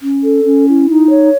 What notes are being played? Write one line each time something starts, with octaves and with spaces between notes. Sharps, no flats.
C#4
A4
C#4
E4
D#4
C#5